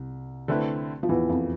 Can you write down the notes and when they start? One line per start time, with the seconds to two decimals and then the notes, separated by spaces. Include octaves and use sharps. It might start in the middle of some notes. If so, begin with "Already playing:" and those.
Already playing: C2
0.48 D3 A3 C4 E4 B4
1.03 F3
1.09 E2 E3
1.29 F2 F3